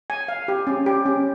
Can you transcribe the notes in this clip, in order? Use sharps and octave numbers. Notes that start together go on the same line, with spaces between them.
G#5
F5
G4
C#4
G4
C#4